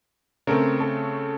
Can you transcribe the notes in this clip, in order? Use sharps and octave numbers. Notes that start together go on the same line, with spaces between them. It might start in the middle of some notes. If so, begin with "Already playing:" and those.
C#3 A3 C4 A#4
A4